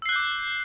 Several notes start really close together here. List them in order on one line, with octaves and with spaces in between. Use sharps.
E6 C7 F#6 G6 D6